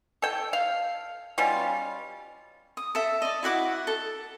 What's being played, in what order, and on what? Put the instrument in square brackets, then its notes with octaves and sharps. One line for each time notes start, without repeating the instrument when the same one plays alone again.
[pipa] A4 G5
F5
B2 G3 C#4 F4
[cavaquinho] D#6
A4 E5
D5 D#5
E4 F#4 F#5 D6
A4